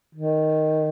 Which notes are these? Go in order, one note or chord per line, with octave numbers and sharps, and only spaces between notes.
D#3